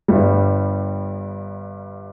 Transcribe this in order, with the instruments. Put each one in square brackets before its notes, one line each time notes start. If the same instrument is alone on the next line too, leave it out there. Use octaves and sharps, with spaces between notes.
[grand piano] G1 G2 G3